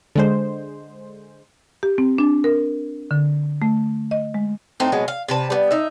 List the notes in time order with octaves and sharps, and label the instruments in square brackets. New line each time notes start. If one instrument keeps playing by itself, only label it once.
[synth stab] D3 G#3 C5
[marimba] G4
C4
D4
A#4
D3
A3
D#5
G#3
[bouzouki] A2 A3 C4 D#4
B2 F#3 G#3 B3
F5
C3 B4 A5
G3 B3
D#4 E5